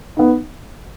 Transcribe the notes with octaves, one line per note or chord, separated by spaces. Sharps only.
B3 D#4